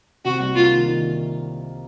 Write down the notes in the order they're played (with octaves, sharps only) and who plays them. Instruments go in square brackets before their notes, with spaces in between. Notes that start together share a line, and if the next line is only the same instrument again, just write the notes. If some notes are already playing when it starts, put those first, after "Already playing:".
[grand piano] C3 [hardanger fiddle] F#4
[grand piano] C2
[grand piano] A#3 [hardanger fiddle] F4
[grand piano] D#3
D#3